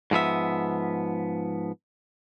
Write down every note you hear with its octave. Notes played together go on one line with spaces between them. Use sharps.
G#2 F3 B3 E5